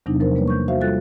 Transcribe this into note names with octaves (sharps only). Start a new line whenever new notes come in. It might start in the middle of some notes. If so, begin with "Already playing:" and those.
E2 C3 F#3 B3 D4 D#4
F3 A#4 C5
G3 A#3 B4 C#5
C#6 G6
F#4 C5 E5 F5
G3 F4 A4 F#6 A6